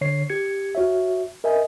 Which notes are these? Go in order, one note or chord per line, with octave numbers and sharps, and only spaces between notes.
D3 C#5 C7
G4 G#6 C#7
F#4 C#5 E5
A#4 D#5 E5 G#5